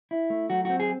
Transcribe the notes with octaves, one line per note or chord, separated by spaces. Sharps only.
E4
A3
F#3 F#4
C4 F#4
G#4